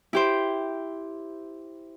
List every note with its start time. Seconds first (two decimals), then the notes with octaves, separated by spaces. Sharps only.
0.13 E4 G4 C5